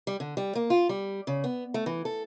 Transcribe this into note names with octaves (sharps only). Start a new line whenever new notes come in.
G3
D3
G3
A#3
F4
G3
C#3
B3
A3
E3
A4